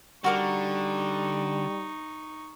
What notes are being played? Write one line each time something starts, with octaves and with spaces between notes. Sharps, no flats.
D3 G3 D#4 F#4 A#4 C#6 D6